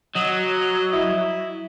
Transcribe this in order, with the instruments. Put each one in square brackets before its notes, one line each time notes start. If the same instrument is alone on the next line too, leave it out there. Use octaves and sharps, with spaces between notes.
[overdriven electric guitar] F#3 [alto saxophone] D#5
[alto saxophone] E4